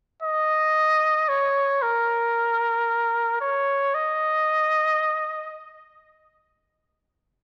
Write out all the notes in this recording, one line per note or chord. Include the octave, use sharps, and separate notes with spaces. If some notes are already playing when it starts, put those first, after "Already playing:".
D#5
C#5
A#4
C#5
D#5